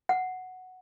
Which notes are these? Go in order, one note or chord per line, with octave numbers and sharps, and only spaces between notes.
F#5